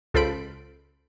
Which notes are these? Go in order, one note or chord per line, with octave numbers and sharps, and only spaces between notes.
C#2 F4 A4 C5 B5 D7